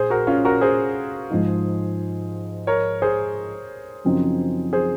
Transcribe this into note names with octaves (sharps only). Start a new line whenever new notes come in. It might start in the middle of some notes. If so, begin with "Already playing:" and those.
Already playing: A#2 G#4 C5
F#4 A#4
C#4 F4
F#4 A#4
G#4 C5
G#2 F3 G#3 D#4
A#4 C#5
G#4 C5
F#2 C#3 F3 C4 D#4
G#4 C5